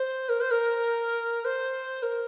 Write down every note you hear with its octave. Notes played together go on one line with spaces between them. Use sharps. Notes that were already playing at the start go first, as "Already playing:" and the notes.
Already playing: C5
A#4
C5
A#4
C5
A#4